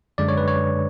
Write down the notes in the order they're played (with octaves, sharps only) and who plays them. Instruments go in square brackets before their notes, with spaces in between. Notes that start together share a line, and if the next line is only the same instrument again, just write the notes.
[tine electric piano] F#2 D3 G#3 D4 D5
C#5
B4
C#5